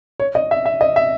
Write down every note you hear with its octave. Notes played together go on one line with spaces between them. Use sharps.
C#5
D#5
E5
E5
D#5
E5